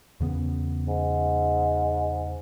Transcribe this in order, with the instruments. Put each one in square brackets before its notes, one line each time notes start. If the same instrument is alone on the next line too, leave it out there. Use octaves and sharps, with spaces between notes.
[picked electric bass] E2 C#3 B3
[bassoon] G#2